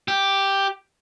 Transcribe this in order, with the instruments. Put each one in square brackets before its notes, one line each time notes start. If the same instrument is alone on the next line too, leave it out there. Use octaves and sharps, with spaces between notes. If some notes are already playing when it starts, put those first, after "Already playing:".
[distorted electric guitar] G4